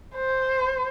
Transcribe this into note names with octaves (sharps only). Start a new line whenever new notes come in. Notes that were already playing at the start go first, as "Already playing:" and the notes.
C5